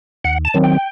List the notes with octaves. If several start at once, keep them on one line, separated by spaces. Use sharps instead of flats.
D#2 F#5
A5
D#3 F#3 C4
G5